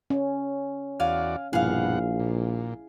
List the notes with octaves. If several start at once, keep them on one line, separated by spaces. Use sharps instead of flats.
C#4
E2 F#4 D5 F5 G#5
A#1 G2 B2 E4 G#4 F5 F#5
A#2